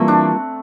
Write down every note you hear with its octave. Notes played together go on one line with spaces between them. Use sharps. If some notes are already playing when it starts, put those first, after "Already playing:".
Already playing: E3 G3 A3 A#3 C4 F4
D4